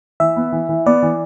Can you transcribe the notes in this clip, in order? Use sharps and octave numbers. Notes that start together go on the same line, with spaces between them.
E3 E5
B3
E3
E3
B3 D5
E3